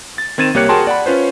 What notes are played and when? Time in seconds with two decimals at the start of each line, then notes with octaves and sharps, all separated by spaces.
0.18 A6
0.38 D#3 C4 G#6 A6 D#7 E7
0.54 C2 A#3 G4 C#5 F#6 C#7
0.69 F#4 G#4 A#4 G5 A5 C6
0.87 D5 F#5 B5
1.06 C#4 F4 B4 C5